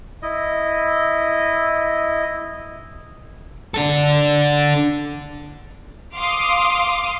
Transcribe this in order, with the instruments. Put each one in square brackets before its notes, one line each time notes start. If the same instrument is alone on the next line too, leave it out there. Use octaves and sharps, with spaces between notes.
[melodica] E4 D#5
[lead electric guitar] D4 A4
[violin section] F5 C6 D6 D#6